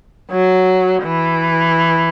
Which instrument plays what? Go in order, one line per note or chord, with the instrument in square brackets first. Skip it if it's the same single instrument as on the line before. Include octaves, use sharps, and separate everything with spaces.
[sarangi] F#3
E3